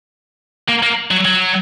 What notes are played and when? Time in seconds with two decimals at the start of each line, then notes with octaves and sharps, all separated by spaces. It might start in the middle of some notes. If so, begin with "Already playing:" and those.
0.69 A#3
0.83 A#3
1.11 F#3
1.25 F#3